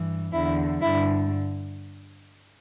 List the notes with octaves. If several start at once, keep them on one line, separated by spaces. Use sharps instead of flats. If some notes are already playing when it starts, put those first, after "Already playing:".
Already playing: G2 E3
E2 D3 E4
G2 D3 E4